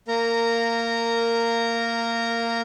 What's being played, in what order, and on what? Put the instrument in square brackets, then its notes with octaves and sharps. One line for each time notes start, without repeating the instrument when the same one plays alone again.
[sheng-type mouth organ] A#3 A#4 A#5